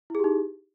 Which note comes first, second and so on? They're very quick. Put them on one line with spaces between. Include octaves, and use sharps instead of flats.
E4 G#4 G4 D#4